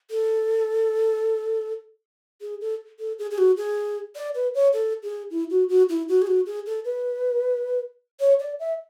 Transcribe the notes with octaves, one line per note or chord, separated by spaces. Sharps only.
A4
G#4
A4
A4
G#4
G#4
F#4
G#4
D5
B4
C#5
A4
G#4
E4
F#4
F#4
E4
F#4
G#4
F#4
G#4
A4
B4
C#5
D5
E5